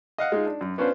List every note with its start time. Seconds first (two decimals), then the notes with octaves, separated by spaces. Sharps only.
0.18 D#5 F5 F#5
0.32 G#3 D#4 F4
0.46 D4
0.61 F#2
0.78 B3 C#4 D4 F4 B4 C5